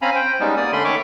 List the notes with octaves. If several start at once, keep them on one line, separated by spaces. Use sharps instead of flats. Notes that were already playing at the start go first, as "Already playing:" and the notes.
C4 C#4 F5 G#5 A#5 B5
C5 G5
G3 G#3 B3 C#4 D#4
A#3 D5 D#6
D3 A3 C#4 B5 C6
D#3 C#5 E5 C#6 D6